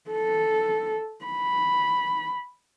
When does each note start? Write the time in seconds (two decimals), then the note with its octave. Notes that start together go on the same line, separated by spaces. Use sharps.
0.10 A4
1.25 B5